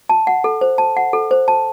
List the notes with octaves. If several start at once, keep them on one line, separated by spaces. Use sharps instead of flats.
A5
F#5
A4
C5
A5
F#5
A4
C5
A5